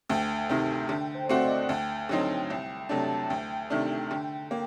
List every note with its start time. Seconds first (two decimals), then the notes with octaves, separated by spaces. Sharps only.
0.09 D2 G5
0.49 C3 D#3
0.89 D3
1.15 C5
1.28 A3 C4 F#4 D5
1.42 D#5
1.55 F#5
1.69 D2 G5
2.09 D3 F#3 C4 D#4
2.50 C2 G5
2.89 C3 F#3 A3 D4 A5
3.29 D2 G5
3.70 C3 D#3 A3 D4
4.11 D3
4.51 A#3